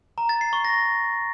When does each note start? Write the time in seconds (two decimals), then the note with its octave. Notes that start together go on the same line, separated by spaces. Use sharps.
0.18 A#5
0.29 A6
0.41 C7
0.53 C#6
0.65 A#6